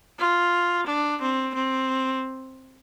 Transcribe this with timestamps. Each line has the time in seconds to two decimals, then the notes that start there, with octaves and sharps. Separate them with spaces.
0.19 F4
0.87 D4
1.22 C4
1.55 C4